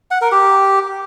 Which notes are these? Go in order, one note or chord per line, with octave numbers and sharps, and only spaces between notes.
F#5
A#4
G4